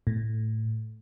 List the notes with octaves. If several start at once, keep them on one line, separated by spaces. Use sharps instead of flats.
A2